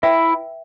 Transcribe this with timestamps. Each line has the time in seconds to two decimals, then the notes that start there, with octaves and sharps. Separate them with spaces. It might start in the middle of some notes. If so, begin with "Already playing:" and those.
0.03 E4 B4 E5 G5